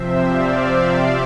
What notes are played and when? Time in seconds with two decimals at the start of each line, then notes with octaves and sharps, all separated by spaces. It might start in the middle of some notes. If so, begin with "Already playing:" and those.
Already playing: C3 F3 C4 C5 E5
0.26 D5 F5